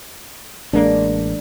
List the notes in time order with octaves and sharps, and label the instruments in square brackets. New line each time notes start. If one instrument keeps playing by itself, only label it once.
[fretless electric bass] A1 G#3 A#3 [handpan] D4